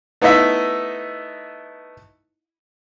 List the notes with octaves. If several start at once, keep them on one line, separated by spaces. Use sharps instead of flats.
A3 B3 D#4 E4 D#5 E5